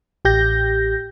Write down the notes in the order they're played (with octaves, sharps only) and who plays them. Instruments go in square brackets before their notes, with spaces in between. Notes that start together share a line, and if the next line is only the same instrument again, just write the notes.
[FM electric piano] A1 G4 G6 A#6